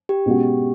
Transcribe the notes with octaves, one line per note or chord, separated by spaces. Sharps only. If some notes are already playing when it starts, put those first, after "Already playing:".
G4
B2 G#3 C#4 F#4